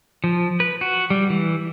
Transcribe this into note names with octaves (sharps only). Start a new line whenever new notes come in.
F3
B4
F#4
G3
E3